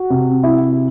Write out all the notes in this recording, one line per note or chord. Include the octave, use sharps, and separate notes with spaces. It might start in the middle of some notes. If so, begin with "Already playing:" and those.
Already playing: F#4
C3
E4